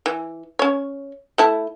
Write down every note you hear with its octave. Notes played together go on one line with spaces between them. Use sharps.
E3
C#4 C#5
A3 E4 A5